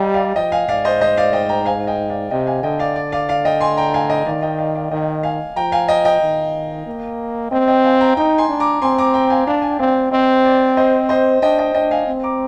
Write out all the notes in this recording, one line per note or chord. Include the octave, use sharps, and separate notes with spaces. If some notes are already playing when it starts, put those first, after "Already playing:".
Already playing: G3 D#5 F5 G5 G#5 A#5
D5 F5
F3 D#5 G5
F5 G#5
G#2 D5 F5
C5 D#5
C5 D#5
D5 F5
D#5 G5
G5 A#5
F5 G#5
D#5 G5
D5 F5
C3 D#5 G5
F5 G#5
D3 D#5 G5
D5 F5
D5
D5 F5
D5 F5
D#5 G5
G#5 C6
G5 A#5
F5 G#5
D#5 G5
D#3 D5 F5
D#5 G5
D5 F5
D5 F5
D#3 D#5 G5
F5 G#5
F3 G5 A#5
F5 G#5
D#5 G5
D#5 G5
D#3
A#3
C4 D#5 G5
D#5 G5
F5 G#5
G5 A#5
D#4 G5 A#5
G#5 C6
D4
A#5 D6
C4 G#5 C6
A#5 D6
G5 A#5
F5 G#5
D4 D5 F5
G#5
G5
C4 D5 F5
C4 C5 D#5
D5
C5 D#5
C5 D#5
D4 D#5 G5
D#5 G5
D4 D#5 G5
F5 G#5
C4
A#5 D6